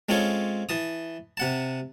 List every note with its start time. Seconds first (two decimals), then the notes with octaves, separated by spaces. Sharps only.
0.09 G#3 C4 C#4 F4 A4 C#5
0.69 E3 A5 D#6
1.37 C3 F#5 A5